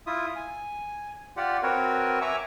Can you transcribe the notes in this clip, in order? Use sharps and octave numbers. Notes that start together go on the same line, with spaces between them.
E4 F4 E5 D#6
G#5
F4 G4 D5 F#5
C4 F#4 A#4 B4 C#5
E5 G#5 A#5 C#6 D6 E6